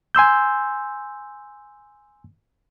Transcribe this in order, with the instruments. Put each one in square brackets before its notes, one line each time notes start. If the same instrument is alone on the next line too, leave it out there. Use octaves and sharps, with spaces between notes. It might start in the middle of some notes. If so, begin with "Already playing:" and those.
[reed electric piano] G#5 C6 E6 G6